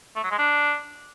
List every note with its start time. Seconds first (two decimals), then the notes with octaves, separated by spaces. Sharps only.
0.16 A3
0.23 F#3
0.31 G#3
0.39 D4